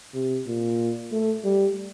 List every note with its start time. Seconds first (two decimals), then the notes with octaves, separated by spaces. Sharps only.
0.14 C3
0.47 A#2
1.12 A3
1.44 G3